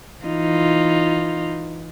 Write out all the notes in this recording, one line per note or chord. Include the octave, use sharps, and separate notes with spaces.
E3 D#4 F4